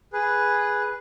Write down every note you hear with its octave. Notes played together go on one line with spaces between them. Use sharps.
G#4 B4